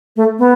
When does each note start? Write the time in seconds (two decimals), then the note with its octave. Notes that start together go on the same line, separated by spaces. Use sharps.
0.16 A3
0.39 B3